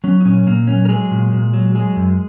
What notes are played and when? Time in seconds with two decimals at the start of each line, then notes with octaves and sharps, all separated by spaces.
0.04 F#3 C#4
0.20 D#4
0.25 A#2 C#4
0.47 A#2 A#3
0.67 F#3 C#4
0.85 A#4
0.89 F#3 G#3 G#4
1.11 A#2
1.33 A#2
1.53 F#3
1.75 F#3 G#3 G#4
1.96 F#2